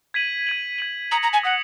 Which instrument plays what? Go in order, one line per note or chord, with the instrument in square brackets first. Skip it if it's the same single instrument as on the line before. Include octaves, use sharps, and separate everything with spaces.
[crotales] G#6 B6 D#7 F#7
G#6 D#7 F#7
G#6 D#7 F#7
[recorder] A#5 [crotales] D#6 A#6 C#7 F#7
[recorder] A#5
G#5
[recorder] F#5 [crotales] D#6 A#6 C#7 F#7